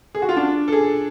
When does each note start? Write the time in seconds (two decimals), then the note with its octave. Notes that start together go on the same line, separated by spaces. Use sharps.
0.15 G#4
0.22 F#4
0.29 F4
0.36 D4
0.68 A4
0.72 G#4